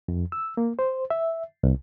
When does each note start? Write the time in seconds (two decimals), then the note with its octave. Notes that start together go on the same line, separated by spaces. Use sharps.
0.08 F2
0.32 E6
0.57 A#3
0.79 C5
1.10 E5
1.63 C2